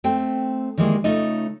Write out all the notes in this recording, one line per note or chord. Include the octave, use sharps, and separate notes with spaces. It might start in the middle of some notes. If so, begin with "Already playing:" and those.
A3 C4 G5
D#3 E3 G3 G#3 A#3
C#3 A3 D#4 F4 D#5